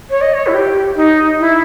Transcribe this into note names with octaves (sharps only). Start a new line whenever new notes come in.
C#5
D#5
C#5
E4
G4
D#4
E4